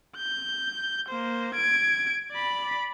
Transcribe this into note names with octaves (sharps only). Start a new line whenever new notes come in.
G6
A#3 C5
G#6 D7
D5 B5